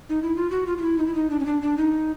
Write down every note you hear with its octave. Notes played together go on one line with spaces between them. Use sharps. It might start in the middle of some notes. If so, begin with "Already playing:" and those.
D#4
E4
F4
F#4
F4
F4
E4
D#4
E4
D#4
D4
C#4
D4
D4
D#4